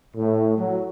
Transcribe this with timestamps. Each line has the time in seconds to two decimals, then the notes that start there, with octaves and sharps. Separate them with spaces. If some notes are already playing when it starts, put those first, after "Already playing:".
0.16 A2
0.58 F#3